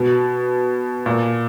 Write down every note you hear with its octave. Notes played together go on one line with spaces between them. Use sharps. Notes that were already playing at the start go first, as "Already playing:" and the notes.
Already playing: B2
A#2